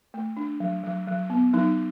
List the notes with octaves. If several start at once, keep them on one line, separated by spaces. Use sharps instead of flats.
A3
D4
F#3
F#3
F#3
B3
F#3 D#4